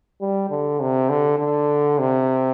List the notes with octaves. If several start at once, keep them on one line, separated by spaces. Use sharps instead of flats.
G3
D3
C3
D3
D3
C3